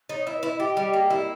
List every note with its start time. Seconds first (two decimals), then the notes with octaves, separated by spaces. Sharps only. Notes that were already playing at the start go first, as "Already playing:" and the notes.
0.09 D#4
0.15 C#5
0.26 E4 D#5
0.37 B4
0.43 E4
0.48 D#5
0.60 G4
0.77 G3
0.94 A#3
1.10 E4